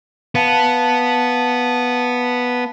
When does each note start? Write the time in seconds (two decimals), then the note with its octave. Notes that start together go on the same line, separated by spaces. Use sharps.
0.35 B3 F5 A5